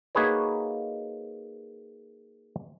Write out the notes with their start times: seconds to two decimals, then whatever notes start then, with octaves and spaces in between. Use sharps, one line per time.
0.15 A#3 D#4 F#4 G#4 B4 C#5